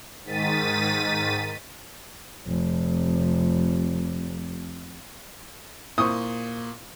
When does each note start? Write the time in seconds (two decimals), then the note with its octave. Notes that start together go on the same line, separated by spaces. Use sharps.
0.25 G#2 D#3 A6 B6 D#7
2.47 F1 C3
5.98 A#2 E4 C5 C#6 D#6